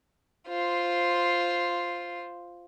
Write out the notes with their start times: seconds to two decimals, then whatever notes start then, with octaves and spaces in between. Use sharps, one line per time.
0.48 F4 C5